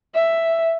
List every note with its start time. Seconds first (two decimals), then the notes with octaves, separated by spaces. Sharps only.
0.15 E5